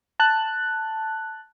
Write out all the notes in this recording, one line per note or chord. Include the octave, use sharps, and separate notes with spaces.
A5 F#6